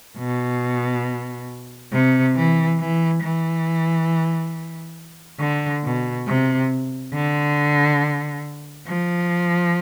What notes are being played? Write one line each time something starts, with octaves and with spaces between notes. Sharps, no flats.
B2
C3
E3
E3
E3
D3
B2
C3
D3
F3